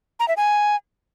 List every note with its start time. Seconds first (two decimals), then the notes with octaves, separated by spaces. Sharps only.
0.20 A#5
0.28 E5
0.37 G#5